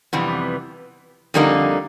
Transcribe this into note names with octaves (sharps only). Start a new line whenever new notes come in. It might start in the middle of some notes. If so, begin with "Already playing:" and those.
F2 C3 E3 G3 B3
F2 D3 G3 A#3 D#4